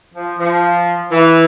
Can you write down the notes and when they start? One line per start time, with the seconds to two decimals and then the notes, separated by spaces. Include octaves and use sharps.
0.15 F3
0.39 F3
1.12 E3